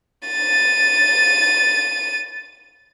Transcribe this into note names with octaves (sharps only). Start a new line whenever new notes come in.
A6 D#7